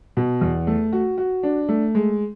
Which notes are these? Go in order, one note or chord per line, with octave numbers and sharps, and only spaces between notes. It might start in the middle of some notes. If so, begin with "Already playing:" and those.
B2
E2
A3
F#4
F#4
D4
A3
G#3